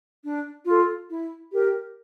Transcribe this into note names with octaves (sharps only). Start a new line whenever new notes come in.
D4
F4 A4
E4
G4 A#4